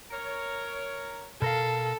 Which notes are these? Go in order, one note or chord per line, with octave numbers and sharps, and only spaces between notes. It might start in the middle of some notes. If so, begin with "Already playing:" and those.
A#4 C#5
B2 A4 A#4 F5